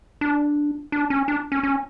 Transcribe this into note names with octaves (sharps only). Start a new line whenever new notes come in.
D4
D4
C#4
D4
C#4
C#4